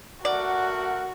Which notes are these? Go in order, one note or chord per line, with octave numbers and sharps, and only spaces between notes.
A3 F#4 A#4 D5 F#5